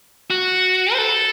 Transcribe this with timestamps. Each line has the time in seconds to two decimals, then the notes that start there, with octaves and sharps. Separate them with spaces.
0.30 F#4
0.93 C5
0.98 A4